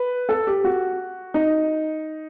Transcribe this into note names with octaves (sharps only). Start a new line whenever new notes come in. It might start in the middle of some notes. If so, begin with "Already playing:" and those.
Already playing: B4
A4
G4
F#4
D#4